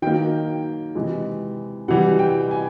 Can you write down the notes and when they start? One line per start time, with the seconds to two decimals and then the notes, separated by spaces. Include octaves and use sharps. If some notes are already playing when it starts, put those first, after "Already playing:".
0.02 D#3 F#3 A#3 G5
0.95 C3 E3 G#3
1.88 C3 E3 G3 F#5
2.19 G5
2.51 G#5